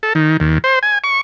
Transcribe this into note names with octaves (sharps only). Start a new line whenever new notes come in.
A4
D#3
D#2
C5
G#5
C#6